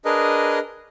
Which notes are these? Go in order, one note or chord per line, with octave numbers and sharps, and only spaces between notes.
D4 G#4 A#4 B4 D#5